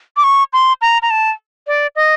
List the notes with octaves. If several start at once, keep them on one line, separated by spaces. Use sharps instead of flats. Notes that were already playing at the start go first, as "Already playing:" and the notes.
D6
C#6
C6
A#5
A#5
A5
D5
D#5